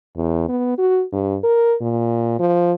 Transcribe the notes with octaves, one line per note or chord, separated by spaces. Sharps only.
E2
B3
F#4
G2
A#4
A#2
F3